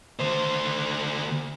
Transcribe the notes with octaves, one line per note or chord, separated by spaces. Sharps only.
D2 C5